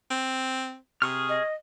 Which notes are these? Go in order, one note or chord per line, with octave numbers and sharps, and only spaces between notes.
C4
C3 G#4 C#6 F6
D#5